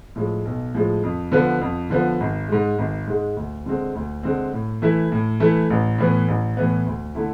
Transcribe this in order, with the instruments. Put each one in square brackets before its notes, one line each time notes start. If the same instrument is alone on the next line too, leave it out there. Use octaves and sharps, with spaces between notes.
[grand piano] A2 F3 G#3
B1
A2 F3 G#3
F2
D3 F3 B3
F2
D3 F3 B3
G#1
G#2 G#3
G#1
G#2 G#3
D2
D3 G#3 C4
D2
D3 G#3 C4
A2
E3 A3 E4
A2
E3 A3 E4
A1
A2 E3 B3
A1
A2 E3 B3
D2
D3 A3 E4